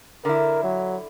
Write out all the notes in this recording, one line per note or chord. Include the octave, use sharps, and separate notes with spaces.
D3 E4 A#4
F#3